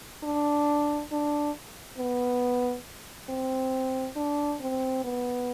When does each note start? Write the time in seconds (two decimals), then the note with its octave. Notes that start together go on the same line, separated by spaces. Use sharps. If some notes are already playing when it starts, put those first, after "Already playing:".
0.24 D4
1.12 D4
1.98 B3
3.30 C4
4.16 D4
4.61 C4
5.04 B3